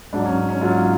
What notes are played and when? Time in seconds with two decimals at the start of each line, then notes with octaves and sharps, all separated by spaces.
0.13 G#2 F#3 D4
0.25 C#4
0.49 C#4
0.61 G#2 F#3 F4